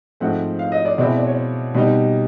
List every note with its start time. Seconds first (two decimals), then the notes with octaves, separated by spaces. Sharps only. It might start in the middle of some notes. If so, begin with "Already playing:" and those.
0.20 G#2 F3 A3 C4 F#5
0.59 F5
0.72 D#5
0.85 D5
0.98 B2 G#3 C4 E4 D5
1.17 D5
1.27 C#5
1.74 B2 G3 C4 D#4